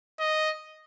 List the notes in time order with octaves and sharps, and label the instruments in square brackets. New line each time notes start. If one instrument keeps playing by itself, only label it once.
[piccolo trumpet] D#5